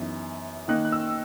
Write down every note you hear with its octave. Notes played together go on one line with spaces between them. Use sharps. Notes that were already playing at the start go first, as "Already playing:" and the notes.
Already playing: F#2 E3 B3 D#4
D#3 A#3 D#4 F#6
F#6
E6